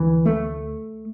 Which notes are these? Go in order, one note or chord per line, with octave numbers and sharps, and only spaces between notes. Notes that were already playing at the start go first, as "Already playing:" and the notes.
Already playing: D2 D3 E3
A3